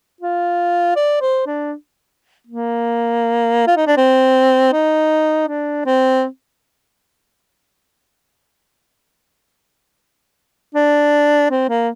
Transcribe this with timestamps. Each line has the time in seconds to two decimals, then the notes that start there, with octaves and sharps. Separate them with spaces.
0.21 F4
0.96 D5
1.21 C5
1.46 D4
2.47 A#3
3.67 F4
3.77 D#4
3.87 D4
3.97 C4
4.73 D#4
5.48 D4
5.86 C4
10.75 D4
11.50 C4
11.69 A#3